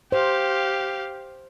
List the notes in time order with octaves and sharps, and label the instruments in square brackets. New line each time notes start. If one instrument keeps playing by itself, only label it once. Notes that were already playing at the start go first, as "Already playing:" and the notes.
[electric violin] G4 F5 [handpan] C5